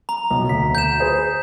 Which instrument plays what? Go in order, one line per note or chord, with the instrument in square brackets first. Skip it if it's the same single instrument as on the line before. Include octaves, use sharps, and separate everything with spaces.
[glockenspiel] A#5
[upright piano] B1
[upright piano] D2 [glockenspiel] B6
[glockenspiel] G6 E7
[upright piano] G#4 B4 C5